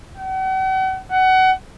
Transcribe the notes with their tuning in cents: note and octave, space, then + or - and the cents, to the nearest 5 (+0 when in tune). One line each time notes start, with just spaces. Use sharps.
F#5 +40
F#5 +25